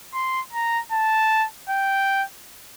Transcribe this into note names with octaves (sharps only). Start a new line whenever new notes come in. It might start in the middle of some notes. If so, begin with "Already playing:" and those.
C6
A#5
A5
G5